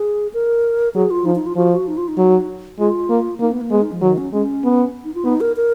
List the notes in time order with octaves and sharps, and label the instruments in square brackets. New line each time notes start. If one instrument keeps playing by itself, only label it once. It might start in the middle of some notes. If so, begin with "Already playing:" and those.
Already playing: [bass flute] G#4
A#4
[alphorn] F#3 [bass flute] G#4
[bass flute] F4
[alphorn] F3 [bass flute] D#4
[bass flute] D#4
F4
[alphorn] F3 [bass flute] F#4
[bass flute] F#4
D#4
F4
D#4
[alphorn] F#3
[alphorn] G#3 [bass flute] F4
[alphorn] A#3
[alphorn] A#3 [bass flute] D#4
[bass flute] B3
A#3
[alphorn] G#3 [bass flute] B3
[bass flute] D#4
F3
[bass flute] D#3 [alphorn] F#3
[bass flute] C#4
[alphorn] G#3 [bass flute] C#4
[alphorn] B3
[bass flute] D#4
F4
[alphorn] B3 [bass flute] D#4
[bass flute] A#4
A#4